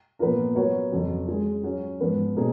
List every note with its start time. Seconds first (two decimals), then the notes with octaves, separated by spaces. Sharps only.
0.19 A#2 F3 B3 F4 A#4
0.55 F#3 B3 F#4 A#4 C#5
0.92 F2 C#3 F#3
1.27 G#3 C#4 F4 G#4
1.63 F#3 C#4 F#4
2.01 G#2 F3 B3
2.36 B2 A#3 C#4 G#4